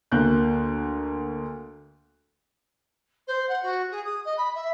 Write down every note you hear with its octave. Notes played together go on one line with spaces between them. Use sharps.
D2 A#3 F#6 G6
C5
F#5
F#4
G#4
D#6
D#5
B5
E5